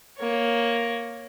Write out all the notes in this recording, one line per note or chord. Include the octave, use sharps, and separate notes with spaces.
A#3 C#5